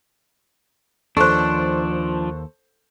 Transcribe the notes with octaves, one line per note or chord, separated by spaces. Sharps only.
D#2 F3 D4 A4 C5 C#6 F#6